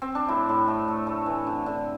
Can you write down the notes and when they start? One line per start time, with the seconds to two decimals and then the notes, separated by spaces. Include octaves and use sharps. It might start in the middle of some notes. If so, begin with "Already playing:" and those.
0.02 C4
0.15 D4
0.28 A2 E4
0.49 A2
0.68 A3
0.88 A3
1.07 A3
1.26 E3
1.47 D3
1.66 D3